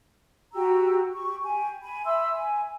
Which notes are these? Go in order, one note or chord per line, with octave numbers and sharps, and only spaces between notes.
F#4 G4 A#5 E6
G4 C#6
G4 G#5
G#5 B5
E5 B5 C6 E6
G#5